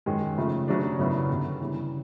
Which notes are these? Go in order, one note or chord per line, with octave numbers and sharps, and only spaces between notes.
F#2 D#3 G#3
C#3 F3 A3
C#3 F#3 A3 D4
F#2 C#3 F#3 B3 E4
G2 D3 G3 B3
C#3 E3 G3 B3 E4